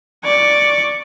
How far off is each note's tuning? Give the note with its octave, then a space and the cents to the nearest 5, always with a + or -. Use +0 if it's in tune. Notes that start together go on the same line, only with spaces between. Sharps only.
D5 +0 C#6 +0